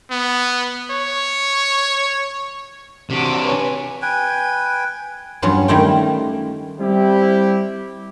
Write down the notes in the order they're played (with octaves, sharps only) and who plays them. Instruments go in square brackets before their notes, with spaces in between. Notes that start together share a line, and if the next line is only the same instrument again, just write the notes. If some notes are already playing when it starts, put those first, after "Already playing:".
[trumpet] B3
C#5
[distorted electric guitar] C3 D4 [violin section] F#4 D6 B6
[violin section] B4 C#5 G#5
[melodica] B4 G5 G#5
[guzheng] E2 G2 F#3 C#4 F4 F#4
D#3 G3 A3 E4 F4 G5
[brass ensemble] G3 C4 E4 G4